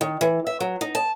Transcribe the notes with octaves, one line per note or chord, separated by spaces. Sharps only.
D#3
E3
E5
F#3
D#4
A5